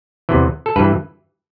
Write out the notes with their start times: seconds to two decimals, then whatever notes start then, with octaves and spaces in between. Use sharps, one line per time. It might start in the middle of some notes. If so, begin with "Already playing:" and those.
0.29 E2 C3 E3
0.66 A4
0.76 G2 B4
0.80 E3